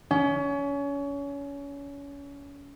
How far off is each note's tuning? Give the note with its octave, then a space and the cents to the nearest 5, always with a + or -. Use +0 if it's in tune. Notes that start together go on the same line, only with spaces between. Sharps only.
C#4 +30